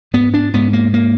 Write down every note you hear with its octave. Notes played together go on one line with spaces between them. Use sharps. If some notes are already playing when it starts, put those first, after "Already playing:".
G#2 B3
D4
G#2 B3
A#3
A#3